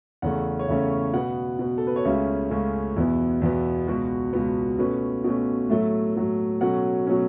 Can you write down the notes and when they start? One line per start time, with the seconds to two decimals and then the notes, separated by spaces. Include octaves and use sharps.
0.22 E2 C#3 A3 C#4 F#5
0.59 C#5
0.68 E2 C#3 A3 C#4 E5
1.13 B2 B3 F#5
1.59 B2 B3
1.78 A4
1.87 B4
1.96 C#5
2.05 C#2 C#3 A3 C#4 E5
2.51 C#2 C#3 A3 C#4
2.96 E2 B2 B3 E4
3.42 E2 B2 B3
3.87 C#2 B2 B3 F#4
4.33 C#2 B2 B3
4.78 B2 A3 C#4 B4
5.24 B2 A3 C#4
5.69 A2 F#3 A3 E5
6.16 A2 F#3 A3
6.61 B2 F#3 A3 C#4 F#5
7.07 B2 F#3 A3 C#4